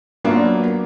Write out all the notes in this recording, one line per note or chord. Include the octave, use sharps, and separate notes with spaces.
F#3 A#3 B3 D4 F4